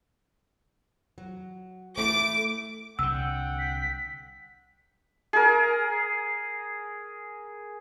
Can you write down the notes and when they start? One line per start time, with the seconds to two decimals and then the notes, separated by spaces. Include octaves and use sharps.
1.18 F#3
1.98 A3 E4 A4 D6
2.99 C2 D3 F#5 G5 E6
3.59 B6
5.33 G#4 A#4